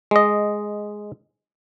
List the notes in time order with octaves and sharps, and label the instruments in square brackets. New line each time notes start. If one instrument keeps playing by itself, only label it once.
[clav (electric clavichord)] G#3 D#5